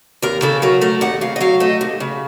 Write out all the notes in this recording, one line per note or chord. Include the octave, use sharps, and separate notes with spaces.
D#2 A#4
C#3 A4
F#3 A#4
A3 A#4
D#2 F#5
C#3 F5
D#5
F#3 F5
A3 D#5
D#2
C#3